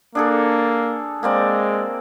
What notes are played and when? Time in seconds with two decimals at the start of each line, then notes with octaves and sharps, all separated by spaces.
0.15 A#3 D4 G#4 A4
1.23 G#3 A#3 C4 D5